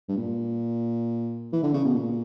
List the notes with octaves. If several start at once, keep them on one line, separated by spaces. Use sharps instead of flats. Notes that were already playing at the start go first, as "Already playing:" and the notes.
G2
A#2
E3
D3
C#3
B2
A#2